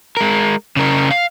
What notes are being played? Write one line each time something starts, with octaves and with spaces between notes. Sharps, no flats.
G#3 A#4
C#3 A#4
F5